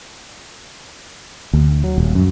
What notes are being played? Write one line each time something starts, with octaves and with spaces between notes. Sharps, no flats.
D2
F#3
D#1
F#2